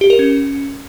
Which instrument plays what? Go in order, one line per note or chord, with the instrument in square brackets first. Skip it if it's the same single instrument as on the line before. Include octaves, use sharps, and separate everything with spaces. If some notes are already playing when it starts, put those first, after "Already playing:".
[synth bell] G4
A#4
C#4